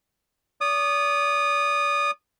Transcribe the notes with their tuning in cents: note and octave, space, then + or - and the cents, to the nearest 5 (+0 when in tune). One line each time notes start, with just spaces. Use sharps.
D5 -40 D#6 -20